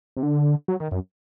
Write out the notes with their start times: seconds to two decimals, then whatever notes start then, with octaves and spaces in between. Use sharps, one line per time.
0.17 C3
0.23 D3
0.68 F#3
0.80 D#3
0.91 F#2